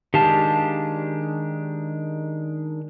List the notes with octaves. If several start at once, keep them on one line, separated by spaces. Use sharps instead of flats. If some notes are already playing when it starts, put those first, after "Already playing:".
D#3 G#3 D4 G4 F5 A5